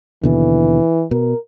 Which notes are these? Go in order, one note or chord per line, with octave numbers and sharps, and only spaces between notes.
D#2 B2 D3 E3
B2 A#4